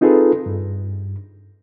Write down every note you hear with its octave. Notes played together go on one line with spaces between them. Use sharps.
C4 D#4 F4 G#4 A4 B4
G2